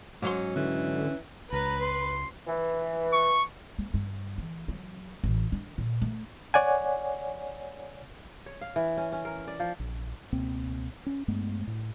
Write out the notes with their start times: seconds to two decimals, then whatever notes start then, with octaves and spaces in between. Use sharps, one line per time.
0.22 G#2 F#3 C#4 C6
0.56 D3 E3 C#4
1.52 C#2 B4 A#5
1.81 C6
2.47 E3
3.13 C#6
3.79 A#3
3.94 G2
4.38 E3
4.68 F#3
5.24 A1
5.52 D4
5.78 A#2
6.02 A3
6.54 C#5 D5 F#5 G#5
8.46 C#5
8.61 F5
8.76 E3
8.97 C#4
9.12 C#4
9.25 A#4
9.47 D5
9.60 F3
9.80 A#1
10.33 C#2 B2 A#3 C4
11.06 C#4
11.28 G2 G#3 A3 B3
11.67 A2